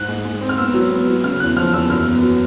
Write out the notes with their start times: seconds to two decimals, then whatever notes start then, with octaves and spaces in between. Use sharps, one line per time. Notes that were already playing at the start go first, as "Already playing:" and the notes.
Already playing: G#2 F#6
0.08 G#3
0.25 G#3
0.41 C4
0.49 F6
0.58 B3 E6
0.74 F#3
0.91 B3
1.07 F#3
1.24 C#3 F6
1.40 E2 F#6
1.56 F3 F6
1.73 E2 E6
1.89 F#2 F6
2.06 B3
2.22 F#3